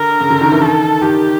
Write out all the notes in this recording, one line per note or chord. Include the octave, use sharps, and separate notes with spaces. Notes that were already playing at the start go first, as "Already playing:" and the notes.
Already playing: D3 A#4
C#3
D3
D#3
E3
D#3 A4
D#3 G4